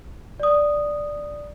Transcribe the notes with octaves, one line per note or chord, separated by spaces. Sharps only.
D5 D#6